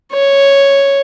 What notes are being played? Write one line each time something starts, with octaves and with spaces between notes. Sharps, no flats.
C#5